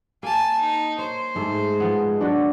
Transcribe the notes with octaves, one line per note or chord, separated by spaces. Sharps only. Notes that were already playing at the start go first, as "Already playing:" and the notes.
A#3 F5 G#5 A5
D#4
C5 C#5
G#2 G#3 A3
F3 B3
F#3 D4 F#4